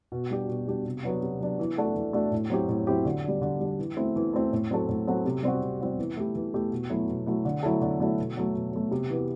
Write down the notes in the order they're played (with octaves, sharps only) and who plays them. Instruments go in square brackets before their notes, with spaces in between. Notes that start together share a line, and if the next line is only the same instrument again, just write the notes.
[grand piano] B2
G3 D4 G4
B2
G3 D4 G4
C3
F#3 B3 D4
C3
F#3 B3 D4
E3
A3 D4 F#4 A4
E3
A3 D4 F#4 A4
A2
F#3 C4 E4 G4
A2
F#3 C4 E4 G4
D3
G3 D4
D3
G3 D4
E3
A3 C4 E4
E3
A3 C4 E4
A2
F#3 C4 F#4 A4
A2
F#3 C4 F#4 A4
C3
G3 C4 F#4
C3
G3 C4 F#4
E3
A3 E4 G4
E3
A3 E4 G4
B2
F#3 A3 E4
B2
F#3 A3 E4
D3
F#3 A3 E4 A4
D3
F#3 A3 E4 A4
B2
F#3 A3
B2
F#3 A3
C3
E3 B3